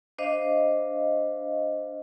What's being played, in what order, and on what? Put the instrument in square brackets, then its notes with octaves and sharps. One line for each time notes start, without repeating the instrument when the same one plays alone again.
[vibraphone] D4 C5 D#5 F5